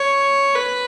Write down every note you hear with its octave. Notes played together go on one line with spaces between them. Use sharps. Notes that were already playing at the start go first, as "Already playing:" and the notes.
Already playing: C#5
B4